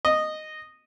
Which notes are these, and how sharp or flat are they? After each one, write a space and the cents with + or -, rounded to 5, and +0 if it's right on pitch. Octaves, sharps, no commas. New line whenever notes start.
D#5 -10